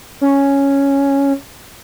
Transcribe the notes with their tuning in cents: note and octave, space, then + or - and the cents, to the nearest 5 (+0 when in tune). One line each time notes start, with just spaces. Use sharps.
C#4 +0